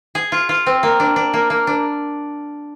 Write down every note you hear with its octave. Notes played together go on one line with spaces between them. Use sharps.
G#4
F4
F4
C4
A#3
D4
D4
A#3
A#3
D4